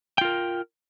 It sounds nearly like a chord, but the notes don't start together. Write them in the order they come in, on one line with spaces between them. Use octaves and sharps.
G5 F4 A#4